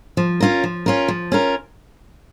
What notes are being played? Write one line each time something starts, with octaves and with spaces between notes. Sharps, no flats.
F3
C#4 F4 A#4
F3
C#4 F4 A#4
F3
C#4 F4 A#4